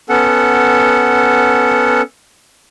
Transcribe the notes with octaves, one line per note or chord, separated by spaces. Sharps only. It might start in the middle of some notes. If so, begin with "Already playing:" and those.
B3 C#4 A4 F#5